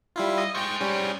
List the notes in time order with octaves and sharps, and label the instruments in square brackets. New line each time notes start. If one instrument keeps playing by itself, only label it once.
[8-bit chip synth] G3 E4 F4
[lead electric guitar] D#5
[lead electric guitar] G#4 C5 [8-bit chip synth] G5 C#6
[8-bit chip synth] G3 C#4